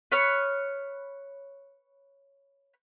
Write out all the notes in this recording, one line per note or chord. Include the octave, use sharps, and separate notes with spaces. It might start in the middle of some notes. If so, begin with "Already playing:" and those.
B4 C#5 F6